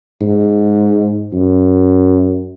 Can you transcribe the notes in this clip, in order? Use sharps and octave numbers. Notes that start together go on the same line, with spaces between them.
G#2
F#2